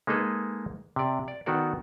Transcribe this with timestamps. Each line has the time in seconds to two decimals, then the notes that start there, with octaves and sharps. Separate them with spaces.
0.07 G#3 A#3 D#4 G#4 A4 B4
0.96 C3 D5
1.28 D5
1.46 D#3 B3 F#4 A4 D5